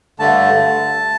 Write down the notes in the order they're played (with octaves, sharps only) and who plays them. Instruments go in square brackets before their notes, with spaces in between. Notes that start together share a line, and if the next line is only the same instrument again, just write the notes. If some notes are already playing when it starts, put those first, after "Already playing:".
[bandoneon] G2 D3 A3 A5